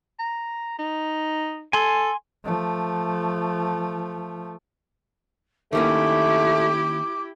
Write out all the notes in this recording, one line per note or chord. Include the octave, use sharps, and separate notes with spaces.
A#5
D#4
A4 G#5 C6
F3 A3
D#3 A3 A#3 C#4 E4 G4 D6